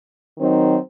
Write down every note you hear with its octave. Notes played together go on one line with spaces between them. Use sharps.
D#3 F#3 C4 D#4